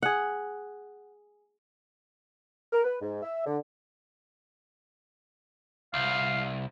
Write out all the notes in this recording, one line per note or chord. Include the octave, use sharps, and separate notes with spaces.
G#4 F#5
A#4
B4
G#2
E5
D3
C2 F5